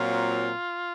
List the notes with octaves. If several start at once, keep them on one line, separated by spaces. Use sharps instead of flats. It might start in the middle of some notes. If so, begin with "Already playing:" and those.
Already playing: A#2 F#3 C4 F4